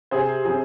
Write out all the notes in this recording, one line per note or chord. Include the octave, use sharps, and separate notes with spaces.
C3 G#4 C5
F3 C4 G#4